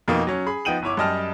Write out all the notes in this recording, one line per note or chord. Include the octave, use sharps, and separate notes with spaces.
F2 B2 A#3 D#4
F#3 C#4
G#4 B5
F3 B3 D#4 G5 D#7 F#7
G1 E4 C#5 D6
F#2 G3 D#5 G5 A5 F6